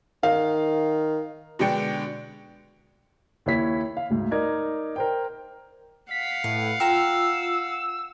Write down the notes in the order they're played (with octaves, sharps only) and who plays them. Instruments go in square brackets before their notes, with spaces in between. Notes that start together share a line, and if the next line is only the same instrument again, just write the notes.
[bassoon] D#3 [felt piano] F5
[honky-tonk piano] B2 D3 G#3 D4 G5 C#7
[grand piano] D#2 E4 C#5 B6
F5
D2 G#2
D#4 A#4 D5 G#6
A#4 C5 G5
[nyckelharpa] F5 F#5 [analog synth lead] B6
[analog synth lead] A2 [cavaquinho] B4
[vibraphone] F4 [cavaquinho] G5 A#5 C6 [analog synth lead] E6